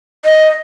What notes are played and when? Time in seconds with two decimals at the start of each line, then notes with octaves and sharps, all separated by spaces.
0.25 D#5